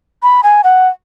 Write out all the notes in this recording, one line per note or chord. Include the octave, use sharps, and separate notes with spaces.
B5
G#5
F#5